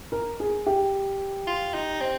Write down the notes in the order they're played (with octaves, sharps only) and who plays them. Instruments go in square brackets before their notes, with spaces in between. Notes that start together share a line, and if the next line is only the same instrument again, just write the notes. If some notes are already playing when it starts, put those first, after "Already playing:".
[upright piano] A#4
G#4
G4
[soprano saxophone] F4
D#4
C4